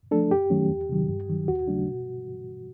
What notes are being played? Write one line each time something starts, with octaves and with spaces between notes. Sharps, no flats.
F3 A3 D4 A4
F#2 G4
D#3 F#3 A3 C#4
E2
C3 D#3 F#3
G2
D#3 F#3
D#2 F#4
C#3 F#3 A3 D4
B2